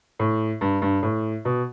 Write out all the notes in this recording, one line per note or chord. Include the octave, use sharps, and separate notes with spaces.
A2
G2
G2
A2
B2